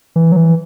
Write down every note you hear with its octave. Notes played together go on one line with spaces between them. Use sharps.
E3
F#3
E3